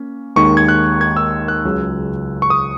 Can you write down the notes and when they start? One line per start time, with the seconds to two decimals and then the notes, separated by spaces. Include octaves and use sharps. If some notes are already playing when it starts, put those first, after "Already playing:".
Already playing: A#3 C#4
0.36 D#2 D#3 G#3 C#6
0.57 G#6
0.68 F#6
1.01 G#6
1.17 E6
1.48 F#6
1.65 C#2 C#3 F#3 C#4
2.42 C#6
2.50 D#6